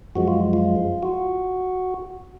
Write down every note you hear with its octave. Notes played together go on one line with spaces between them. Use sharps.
F#2 F3 G#3 F#4
F4
F4
F#4